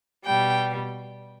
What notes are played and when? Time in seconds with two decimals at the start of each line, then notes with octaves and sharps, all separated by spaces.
0.25 B2 G3 G5